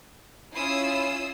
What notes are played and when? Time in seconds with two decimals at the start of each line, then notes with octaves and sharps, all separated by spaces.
0.55 C#4 E4 F4 D#6 E6 C7